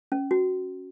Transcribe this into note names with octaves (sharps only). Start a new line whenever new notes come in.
C#4
F#4